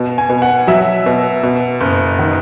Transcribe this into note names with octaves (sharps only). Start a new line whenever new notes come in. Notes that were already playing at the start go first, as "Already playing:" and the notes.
Already playing: B2
G#5
B2
F#5
F#3 E5
B2
B2
F#1
D#3